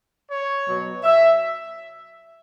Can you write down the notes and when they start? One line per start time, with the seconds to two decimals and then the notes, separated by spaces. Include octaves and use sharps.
0.28 C#5
0.66 B2 F#3
1.04 E5